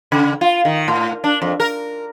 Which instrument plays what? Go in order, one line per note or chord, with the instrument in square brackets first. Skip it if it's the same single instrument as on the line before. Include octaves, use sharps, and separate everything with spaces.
[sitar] C#3
F4
D#3
A2
D4
F2
A#4